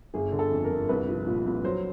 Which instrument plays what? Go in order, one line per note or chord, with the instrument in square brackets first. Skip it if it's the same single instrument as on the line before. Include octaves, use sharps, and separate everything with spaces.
[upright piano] G1 G#4
D3
A4
F2
A#4
G1
C2 B4
F3
A#2
C2
F#3 C5